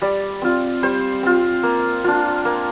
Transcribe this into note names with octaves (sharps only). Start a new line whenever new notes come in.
G3 D5
C4 F4
G3 C5
C4 F4
A#3
D4 F4
A#3